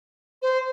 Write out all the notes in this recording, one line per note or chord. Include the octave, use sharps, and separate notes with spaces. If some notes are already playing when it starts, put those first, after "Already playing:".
C5